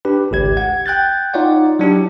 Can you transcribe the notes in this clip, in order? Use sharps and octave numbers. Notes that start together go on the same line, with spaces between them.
D4 G4 B4
G#1 C#2 G4 G#6
F#5 G#6
G5 F#6 G6 A6
D#4 F4 C#5 D5 F#5
F#3 D4 E4 G4